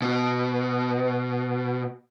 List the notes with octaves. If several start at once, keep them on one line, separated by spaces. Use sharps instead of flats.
B2